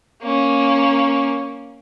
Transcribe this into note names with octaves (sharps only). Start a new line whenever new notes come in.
A#3 C#4